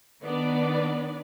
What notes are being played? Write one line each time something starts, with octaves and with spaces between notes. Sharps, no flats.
D#3 B3 D4 B4 D5